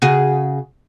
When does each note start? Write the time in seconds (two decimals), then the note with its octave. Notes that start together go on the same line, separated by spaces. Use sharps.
0.02 C#3 F#4 G#4